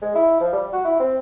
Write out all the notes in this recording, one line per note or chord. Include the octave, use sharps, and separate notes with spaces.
G#3
E4
F3
G3
F#4
E4
C4